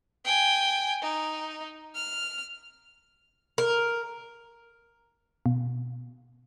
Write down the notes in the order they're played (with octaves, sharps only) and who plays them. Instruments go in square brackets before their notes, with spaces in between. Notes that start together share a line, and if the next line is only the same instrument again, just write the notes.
[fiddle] G5 G#5
D#4
F6
[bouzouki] A#4
[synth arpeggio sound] B2